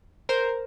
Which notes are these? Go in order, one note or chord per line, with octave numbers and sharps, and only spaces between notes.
A#4 C5